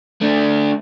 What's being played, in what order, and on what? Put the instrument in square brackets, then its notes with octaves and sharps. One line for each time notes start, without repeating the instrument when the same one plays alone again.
[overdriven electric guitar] A3 D4